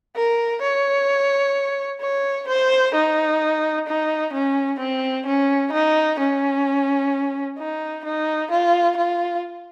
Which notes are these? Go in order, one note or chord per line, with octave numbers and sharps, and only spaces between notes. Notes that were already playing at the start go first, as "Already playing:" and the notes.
A#4
C#5
C#5
C5
D#4
D#4
C#4
C4
C#4
D#4
C#4
D#4
D#4
F4
F4